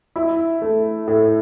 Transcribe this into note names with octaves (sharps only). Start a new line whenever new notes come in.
E4
A3
A2